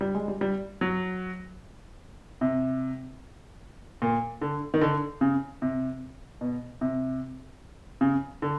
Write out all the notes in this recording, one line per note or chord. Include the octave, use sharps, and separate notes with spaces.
G3
G#3
G3
G3
F#3
C3
A#2
D3
D#3
D3
C#3
C3
B2
C3
C#3
D3